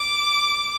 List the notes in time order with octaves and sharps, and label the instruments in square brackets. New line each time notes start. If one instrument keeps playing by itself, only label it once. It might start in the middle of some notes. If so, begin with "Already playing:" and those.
Already playing: [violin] D6